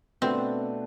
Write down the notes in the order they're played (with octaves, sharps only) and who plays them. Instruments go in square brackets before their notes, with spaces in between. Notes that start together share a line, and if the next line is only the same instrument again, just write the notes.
[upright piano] B2 A3 D4 F#4 B4 [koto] C4